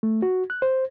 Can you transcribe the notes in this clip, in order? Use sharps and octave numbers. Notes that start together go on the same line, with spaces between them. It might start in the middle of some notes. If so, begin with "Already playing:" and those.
A3
F#4
F#6
C5